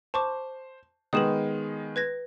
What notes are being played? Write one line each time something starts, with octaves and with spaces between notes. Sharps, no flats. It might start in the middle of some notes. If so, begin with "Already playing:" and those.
C5 A5 C#6 D6
D#3 G#3 B3 D#6 E7 F#7
B4 G#6 A#6